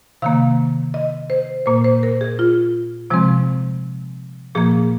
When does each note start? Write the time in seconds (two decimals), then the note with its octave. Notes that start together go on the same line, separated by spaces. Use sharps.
0.22 C3 D#3 A#3 F5
0.94 D#5
1.30 C5
1.66 A#2 A#3 C5
1.84 C5
2.03 A#4
2.21 G#4
2.39 F4
3.10 C3 F3 G#3 C4
4.55 A#2 F3 A#3 G#4